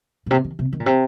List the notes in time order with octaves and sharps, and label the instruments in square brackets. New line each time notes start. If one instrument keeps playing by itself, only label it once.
[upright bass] A#2
C3
D#3
C3
D#3
A#2
C3